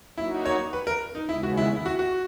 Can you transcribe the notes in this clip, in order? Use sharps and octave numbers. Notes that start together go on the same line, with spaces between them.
F#3 A#3 D#4 E4 F#4
C#5
B4
A#4
D#4
D#2 C#3 G#3 B3 E4
F#4
E4
E4
F#4
F#4